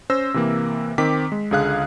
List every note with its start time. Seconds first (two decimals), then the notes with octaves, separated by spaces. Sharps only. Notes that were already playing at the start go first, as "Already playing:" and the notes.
0.10 C#4 C5 E6 A#6
0.34 C3 E3 A#3
0.98 D#3 C4 D6 B6
1.32 G#3
1.51 C#2 D3 G#4 F5 F#6